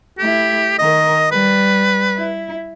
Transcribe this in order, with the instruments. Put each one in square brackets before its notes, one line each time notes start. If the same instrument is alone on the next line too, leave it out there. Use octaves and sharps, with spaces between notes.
[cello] A3 E4 [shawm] G4
[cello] D#3 A#4 [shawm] D#5
[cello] G3 [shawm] B4
[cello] E4